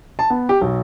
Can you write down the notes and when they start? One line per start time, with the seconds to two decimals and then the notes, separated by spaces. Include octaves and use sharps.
0.19 A5
0.30 B3
0.49 G4
0.62 B1